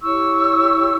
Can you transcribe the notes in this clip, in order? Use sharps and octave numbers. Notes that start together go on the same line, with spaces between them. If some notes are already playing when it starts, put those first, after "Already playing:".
E4 G4 C#5 C#6 E6